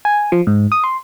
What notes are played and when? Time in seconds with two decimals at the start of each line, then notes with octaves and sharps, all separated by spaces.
0.05 G#5
0.32 F3
0.47 G#2
0.72 D#6
0.84 C6